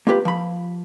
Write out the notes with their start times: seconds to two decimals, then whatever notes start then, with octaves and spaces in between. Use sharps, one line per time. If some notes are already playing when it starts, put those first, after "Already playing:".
0.07 A#3 F4 G4 B4
0.25 F3 B5